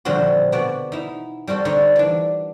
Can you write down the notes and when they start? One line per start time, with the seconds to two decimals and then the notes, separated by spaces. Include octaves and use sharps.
0.05 A#2 D3 F3 G3 C4 F#4
0.52 B2 B3 F#4 D5
0.92 D#4 E4
1.47 G3 C4 F#4 A4
1.65 D3 D#4 C5 C#5
1.96 E3 D4